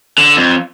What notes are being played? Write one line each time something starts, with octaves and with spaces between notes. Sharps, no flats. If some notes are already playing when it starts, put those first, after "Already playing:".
D3
F2